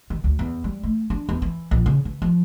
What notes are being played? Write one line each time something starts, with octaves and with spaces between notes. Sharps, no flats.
D#3
D2
E2
G3
A3
D4
E2
E3
A#1
C#3
E3
F3